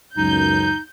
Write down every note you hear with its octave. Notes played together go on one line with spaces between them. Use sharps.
C#2 F#2 D#4 G6